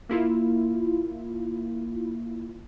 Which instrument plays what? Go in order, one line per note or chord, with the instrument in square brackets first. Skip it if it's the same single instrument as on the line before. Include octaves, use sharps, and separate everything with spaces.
[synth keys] A#3 E4 F4